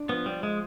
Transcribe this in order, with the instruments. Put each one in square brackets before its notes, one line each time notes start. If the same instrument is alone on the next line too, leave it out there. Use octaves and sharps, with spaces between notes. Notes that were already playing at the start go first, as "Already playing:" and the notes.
Already playing: [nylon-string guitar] D4
[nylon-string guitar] F3 [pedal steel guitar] B3
[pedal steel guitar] G3
G#3